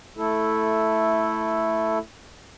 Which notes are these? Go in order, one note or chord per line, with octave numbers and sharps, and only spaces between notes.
A3 E4 A4